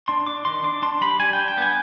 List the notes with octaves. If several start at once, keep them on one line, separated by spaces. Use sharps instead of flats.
D4 C6
D4 D6
D#3 C6
D4 D6
D4 C6
G3 B5
G3 G#5
G5
D4
G5
B3 G#5